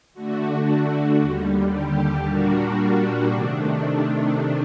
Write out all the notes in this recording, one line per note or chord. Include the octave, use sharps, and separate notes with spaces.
D3 A3 D4 F#4
D#2 D3 G3
G4
A#2 G3 A#3 D4 F#4
D4
C3 D#3 A3